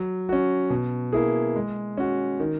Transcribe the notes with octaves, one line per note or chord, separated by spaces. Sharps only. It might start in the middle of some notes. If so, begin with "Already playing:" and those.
Already playing: F#3
C#4 F#4
B2
A#3 E4 G#4
G#3
C#4 F#4
D#3